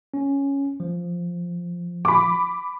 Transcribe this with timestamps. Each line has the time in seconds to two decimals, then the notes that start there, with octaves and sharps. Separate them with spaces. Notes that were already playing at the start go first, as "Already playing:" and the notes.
0.14 C#4
0.80 F3
2.05 B5 D6